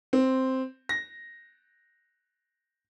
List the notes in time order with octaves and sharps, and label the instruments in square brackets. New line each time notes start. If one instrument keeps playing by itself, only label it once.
[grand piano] C4
A#6